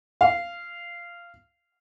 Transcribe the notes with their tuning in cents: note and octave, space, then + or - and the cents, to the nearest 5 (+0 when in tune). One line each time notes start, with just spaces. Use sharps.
F5 -15